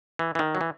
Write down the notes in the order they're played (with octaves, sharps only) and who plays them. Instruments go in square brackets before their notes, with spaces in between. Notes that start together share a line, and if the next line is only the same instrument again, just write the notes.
[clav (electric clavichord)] E3
E3
D#3
F#3
E3